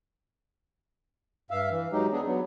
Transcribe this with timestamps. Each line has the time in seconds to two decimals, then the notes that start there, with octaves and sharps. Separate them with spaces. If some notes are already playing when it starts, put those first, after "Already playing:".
1.51 G2 E5 F5
1.71 E3
1.92 F#3 G#3 D#4 G4
2.12 B3 D4 G#4
2.26 F#3 B3